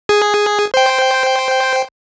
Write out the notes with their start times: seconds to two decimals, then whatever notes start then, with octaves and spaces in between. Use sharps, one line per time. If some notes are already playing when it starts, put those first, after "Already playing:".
0.09 G#4
0.74 C5 G5